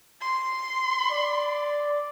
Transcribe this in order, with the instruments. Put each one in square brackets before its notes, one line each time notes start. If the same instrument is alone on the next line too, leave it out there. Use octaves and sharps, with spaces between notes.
[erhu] C6
[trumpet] D5